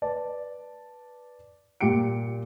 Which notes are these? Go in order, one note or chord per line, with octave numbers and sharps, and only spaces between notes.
B4 D5 A5
A#2 G3 G4 C#7 D7